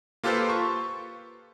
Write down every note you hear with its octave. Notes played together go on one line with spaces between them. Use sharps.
A#3 F4 G4 A4 B4 C5
C#6